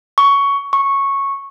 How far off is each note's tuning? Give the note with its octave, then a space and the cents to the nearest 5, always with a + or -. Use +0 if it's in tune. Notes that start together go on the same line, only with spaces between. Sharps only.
C#6 +15
C#6 -10